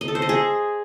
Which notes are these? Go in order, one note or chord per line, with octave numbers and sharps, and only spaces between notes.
D#5
A4
C5
D#5
G#4